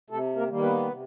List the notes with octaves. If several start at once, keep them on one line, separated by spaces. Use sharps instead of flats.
C3 A3 A4
A#3 A#4
D#3 G3 A#3
B3 B4
C3